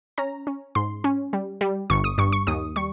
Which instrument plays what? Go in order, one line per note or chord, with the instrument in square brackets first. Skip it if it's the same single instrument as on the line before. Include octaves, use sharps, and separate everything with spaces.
[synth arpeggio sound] C#4 A#5
C#4
G#2 C6
C#4
G3
G3
G1 C#6
D#6
G2 C#6
C#6
D#2 D#6
G3 C#6